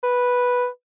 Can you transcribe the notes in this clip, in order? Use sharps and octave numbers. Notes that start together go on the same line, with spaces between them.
B4